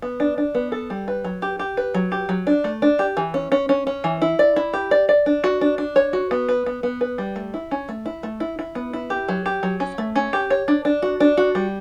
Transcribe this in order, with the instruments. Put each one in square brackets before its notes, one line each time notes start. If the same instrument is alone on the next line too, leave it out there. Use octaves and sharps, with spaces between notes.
[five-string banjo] B3
D4
D4
B3
A4
G3
B4
F#3
G4
G4
B4
F#3
G4
F#3
D4
A3
D4
G4
E3
C#4
C#4
C#4
C#4
E3
E4
D5
E4
G4
D5
D5
D4
F#4
D4
D4
C#5
F#4
B3
B4
B3
B3
B4
G3
A3
E4
C#4
A3
E4
A3
E4
E4
B3
E4
G4
F#3
G4
F#3
C#4
A3
C#4
G4
C#5
D4
D4
F#4
D4
F#4
G3